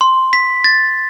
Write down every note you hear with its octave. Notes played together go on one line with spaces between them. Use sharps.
C6
B6
A6